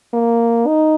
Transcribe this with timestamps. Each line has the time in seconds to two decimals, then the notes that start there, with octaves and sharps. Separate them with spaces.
0.13 A#3
0.67 D#4